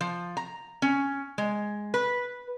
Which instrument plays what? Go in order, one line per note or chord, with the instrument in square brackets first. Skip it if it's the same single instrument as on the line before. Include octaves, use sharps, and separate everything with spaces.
[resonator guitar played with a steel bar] F3
A#5
C#4
G#3
B4